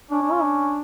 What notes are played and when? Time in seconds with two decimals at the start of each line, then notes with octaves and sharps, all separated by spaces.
0.11 C#4 D4
0.22 D4
0.32 F4
0.43 D4